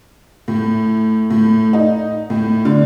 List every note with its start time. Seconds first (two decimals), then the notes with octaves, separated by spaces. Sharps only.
0.48 A2
1.30 A2
1.73 D#4
2.30 A2
2.65 D3